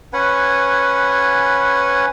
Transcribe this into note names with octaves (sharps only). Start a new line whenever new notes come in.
C#4 B4 F#5 G#5